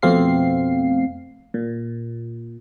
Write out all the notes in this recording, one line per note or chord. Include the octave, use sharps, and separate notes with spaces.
F2 B2 A3 C4 F5 C7
A#2